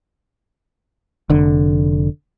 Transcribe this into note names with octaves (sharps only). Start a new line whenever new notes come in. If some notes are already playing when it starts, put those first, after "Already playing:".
F1 D3